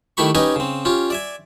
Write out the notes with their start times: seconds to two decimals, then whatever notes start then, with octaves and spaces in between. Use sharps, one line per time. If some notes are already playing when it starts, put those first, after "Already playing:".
0.17 D#3 A3 E4 G4 B5 C#6
0.35 C#4 D#4 G4 B4 D#5 G#5
0.56 C#3 C4
0.85 C#4 F4 G4
1.10 D5 E5 G#5